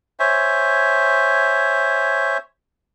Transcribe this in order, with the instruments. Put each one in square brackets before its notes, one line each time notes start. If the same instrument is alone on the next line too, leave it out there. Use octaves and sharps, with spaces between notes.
[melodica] C5 C#5 E5 G#5